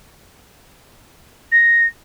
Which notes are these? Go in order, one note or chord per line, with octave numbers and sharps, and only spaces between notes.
A#6